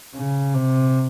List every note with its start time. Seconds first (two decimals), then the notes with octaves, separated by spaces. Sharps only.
0.15 C#3
0.54 C3